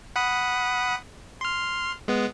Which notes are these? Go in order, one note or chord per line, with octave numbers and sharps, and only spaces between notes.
F#5 B5 D#6
C6 F6
G#3 B3